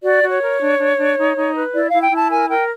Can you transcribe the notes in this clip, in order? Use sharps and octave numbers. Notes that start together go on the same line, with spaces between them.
F#4 D5
F#4
C#5
A#4
D4
D4
D4
D#4
D#4
B4
E4 D5
E4 F5
G5
E4
A5
A#4 G#5
A#4 G5